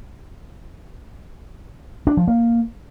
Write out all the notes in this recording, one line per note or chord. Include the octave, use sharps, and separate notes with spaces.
D4
F3
A#3